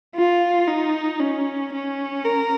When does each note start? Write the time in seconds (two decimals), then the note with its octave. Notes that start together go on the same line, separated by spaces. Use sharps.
0.15 F4
0.67 D#4
1.20 C#4
1.73 C#4
2.25 A#4